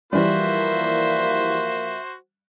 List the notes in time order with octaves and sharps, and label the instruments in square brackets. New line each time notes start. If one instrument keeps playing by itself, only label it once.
[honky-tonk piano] E3 G3 [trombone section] F3 A#3 [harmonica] F#4 C5 [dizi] E5